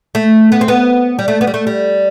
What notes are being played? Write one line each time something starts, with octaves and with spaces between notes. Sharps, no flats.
A3
B3
C4
B3
G3
A3
B3
G3
A3
G3